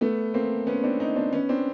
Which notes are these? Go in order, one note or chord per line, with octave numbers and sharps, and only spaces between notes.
A3 B3
A#3 C4
B3 C#4
C4 D4
C#4 D#4
C4 D4
B3 C#4
C4 D4